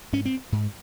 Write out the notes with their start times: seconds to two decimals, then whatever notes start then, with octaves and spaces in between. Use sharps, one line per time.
0.13 G#2 C#4
0.25 C4
0.52 G#2